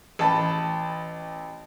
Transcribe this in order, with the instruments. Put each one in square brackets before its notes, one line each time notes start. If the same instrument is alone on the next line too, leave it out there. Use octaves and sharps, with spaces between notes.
[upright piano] A1 A5 B5